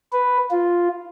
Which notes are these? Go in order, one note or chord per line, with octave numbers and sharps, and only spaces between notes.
B4
F4